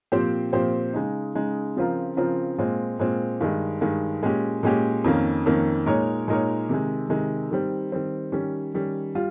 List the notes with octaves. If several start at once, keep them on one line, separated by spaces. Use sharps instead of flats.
A#2 F3 C4 G4 C5
A#2 F3 C4 G4 C5
C#3 G#3 D#4
C#3 G#3 D#4
C#3 F3 C4 F4 A#4
C#3 F3 C4 F4 A#4
A#2 G#3 C4 F4
A#2 G#3 C4 F4
G2 D#3 G#3
G2 D#3 G#3
A#2 G#3 C#4 G4
A#2 G#3 C#4 G4
F2 D#3 A#3 C#4
F2 D#3 A#3 C#4
A#2 G#3 D#4 A#4 C#5
A#2 G#3 D#4 A#4 C#5
C3 D#3 G#3
C3 D#3 G#3
D#3 G3 C4
D#3 G3 C4
D#3 G3 C#4
D#3 G3 C#4
G3 F4